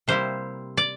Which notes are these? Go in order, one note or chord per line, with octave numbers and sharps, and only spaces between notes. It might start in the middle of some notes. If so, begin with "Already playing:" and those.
C3 G3 A#3 E4 C5
D5